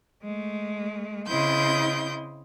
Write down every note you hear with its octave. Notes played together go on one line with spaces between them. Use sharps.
G#3 A3
C#3 C4 E4 D#5 C6 G6